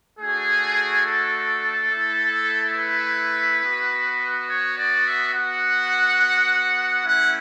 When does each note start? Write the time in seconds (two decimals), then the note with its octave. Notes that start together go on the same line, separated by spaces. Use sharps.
0.20 A3 D4 F#4 G#4
1.05 A4
1.91 A3 E4
2.77 B4
3.63 B3 F#4
4.48 C#5
4.77 D5
5.06 E5
5.34 B3 F#4 F#5
7.05 A3 C#4 E4 F#5